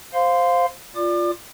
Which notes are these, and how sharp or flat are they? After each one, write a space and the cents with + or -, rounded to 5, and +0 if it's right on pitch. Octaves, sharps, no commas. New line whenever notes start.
C5 +0 F5 +5 C6 -20
F4 +0 D5 +0 D6 +40